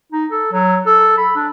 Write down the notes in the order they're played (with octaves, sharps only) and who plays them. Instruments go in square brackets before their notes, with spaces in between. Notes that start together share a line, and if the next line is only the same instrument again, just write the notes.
[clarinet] D#4
A4
F#3
A4
B5
D4